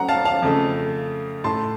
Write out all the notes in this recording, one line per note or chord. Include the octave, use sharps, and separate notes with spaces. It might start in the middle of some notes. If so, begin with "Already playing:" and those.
Already playing: F#3 A3 F#5 A#5
F5 A5
F5 A5
F2 C#3 A3
A2 A3 A5 C6